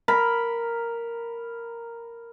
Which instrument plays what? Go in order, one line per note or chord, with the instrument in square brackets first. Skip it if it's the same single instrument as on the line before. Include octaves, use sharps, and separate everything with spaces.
[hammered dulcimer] A#4 B5